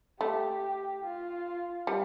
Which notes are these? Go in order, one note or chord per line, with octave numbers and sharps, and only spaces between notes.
A3 G4
F4
G3